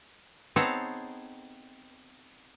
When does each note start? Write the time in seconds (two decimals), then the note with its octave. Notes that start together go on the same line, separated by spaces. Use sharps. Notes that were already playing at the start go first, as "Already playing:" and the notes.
0.56 B3 C4 D#4 G#4 A4 C#5